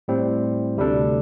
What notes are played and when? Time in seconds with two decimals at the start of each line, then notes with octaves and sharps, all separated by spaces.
0.08 A2 G3 C4
0.77 D2 C3 G3 D4 A4